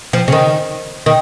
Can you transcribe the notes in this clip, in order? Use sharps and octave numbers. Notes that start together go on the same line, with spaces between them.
F3
C#3
D#3
D#3